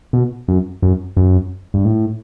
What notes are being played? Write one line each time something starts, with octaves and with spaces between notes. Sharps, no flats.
B2
F#2
F#2
F#2
G2
A2